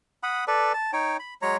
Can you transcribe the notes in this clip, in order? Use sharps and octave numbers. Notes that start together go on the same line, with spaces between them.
F#5 B5 D#6
A4 B4 D5
A5
D#4 C#5 G5
B5
F#3 G#3 C#5 A#5